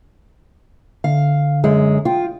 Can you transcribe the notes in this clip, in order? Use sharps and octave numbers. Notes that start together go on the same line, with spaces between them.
D3 F5
F#2 G#3
F4 G5